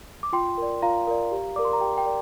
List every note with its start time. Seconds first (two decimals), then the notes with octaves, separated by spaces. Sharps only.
0.23 D6
0.33 F4 G5 C6
0.58 A#4 D5
0.82 F4 F5 A#5
1.07 A#4 D5
1.32 G4
1.56 A#4 D5 D6
1.65 C6
1.73 A#5
1.81 G4 G5
1.98 G5
2.06 A#4 D5